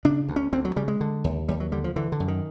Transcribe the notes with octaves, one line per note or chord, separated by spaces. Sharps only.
C#3 D4
D2
C#4
D2 C4
F#3
C#3 G3
G#3
D3
D#2
D#2 G3
F#3
D3 G3
F3
D3 E3
D3
F#2
D#3